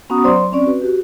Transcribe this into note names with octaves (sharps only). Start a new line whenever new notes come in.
B3 C#4 F#4 F#5 A#5 D#6
F#3 C5 D5 C6 D6
C4 C#4 D5
F#4 B4
F#4 G4